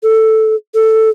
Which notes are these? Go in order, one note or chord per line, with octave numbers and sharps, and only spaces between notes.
A4
A4